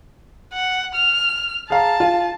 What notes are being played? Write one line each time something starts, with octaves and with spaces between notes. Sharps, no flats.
F#5
F6
G#4 F5 A5 A#5
F4